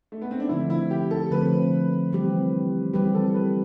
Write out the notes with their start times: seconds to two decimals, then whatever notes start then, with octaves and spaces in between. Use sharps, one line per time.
0.12 A3
0.22 B3
0.31 C4
0.40 D4
0.49 D3 F3 A3 C4 E4
0.70 E4
0.91 G4
1.11 A4
1.31 D3 F3 A3 C4 B4
2.12 E3 G3 C4 G4
2.93 E3 G3 C4 G4 B4
3.15 A4
3.34 B4